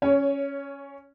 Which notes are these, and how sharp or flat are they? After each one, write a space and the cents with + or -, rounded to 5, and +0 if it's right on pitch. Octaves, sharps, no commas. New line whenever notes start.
C#4 +0 C#5 +20